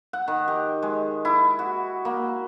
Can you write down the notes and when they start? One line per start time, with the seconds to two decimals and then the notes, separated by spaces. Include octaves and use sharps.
0.13 F#5
0.28 D#3
0.48 G4
0.83 G#3
1.25 E4
1.59 F#4
2.05 A#3